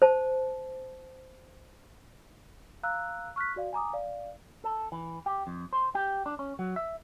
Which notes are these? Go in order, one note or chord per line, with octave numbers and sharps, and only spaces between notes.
C5 A5
F5 A#5 E6 F#6
C#6 F6 F#6 B6
F#4 D5 F5
G#5 A#5 D6 D#6
D5 F5
A4
E3
G4
F2
C5
G4
D4
C#4
F#3
E5